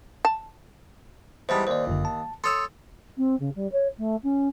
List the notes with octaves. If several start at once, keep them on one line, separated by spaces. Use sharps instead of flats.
A5
E2 G#2 G3 C5 A5
D#2 C5 D5
G1 F#2 D3
A5
A4 C#5 C6 D#6 E6
C4
C#3
G3
C#5
A3
C#4